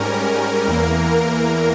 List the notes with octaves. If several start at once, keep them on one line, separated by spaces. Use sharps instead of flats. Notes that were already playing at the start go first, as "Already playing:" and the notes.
Already playing: G#2 G3 C#4 A#4
E2 E3 A#3